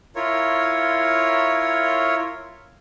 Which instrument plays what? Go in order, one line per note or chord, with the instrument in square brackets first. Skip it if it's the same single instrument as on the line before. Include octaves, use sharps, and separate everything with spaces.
[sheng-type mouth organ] E4 F4 A#4 C#5